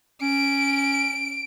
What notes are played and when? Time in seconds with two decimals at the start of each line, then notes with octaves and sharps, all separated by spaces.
0.22 C#4 D7